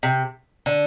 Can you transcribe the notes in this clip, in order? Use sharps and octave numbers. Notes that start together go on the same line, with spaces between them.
C3
D3